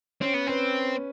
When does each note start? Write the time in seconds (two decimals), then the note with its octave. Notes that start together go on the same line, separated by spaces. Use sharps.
0.21 C4 C#4
0.34 B3
0.47 C4 B4